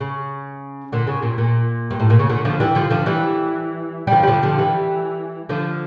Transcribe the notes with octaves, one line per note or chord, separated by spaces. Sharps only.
C#3
A#2 D3
C#3
A#2
A#2
G2
A2
A#2
C#3
A#2 D3
D3 F3
E3 G3
D3 F3
D3 F3
E3 G3
G3
D3 F3
G3
D3 F3
D3 F3
E3 G3
D3 F3